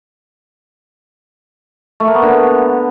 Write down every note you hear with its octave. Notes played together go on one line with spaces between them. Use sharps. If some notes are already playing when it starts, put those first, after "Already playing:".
A3
A#3
B3
D3